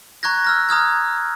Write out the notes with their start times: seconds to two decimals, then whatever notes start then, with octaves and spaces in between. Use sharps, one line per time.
0.23 A#5 C#6 F#6 G#6 A#6
0.44 E6 F6 A#6
0.69 A#5 D#6 F6 G#6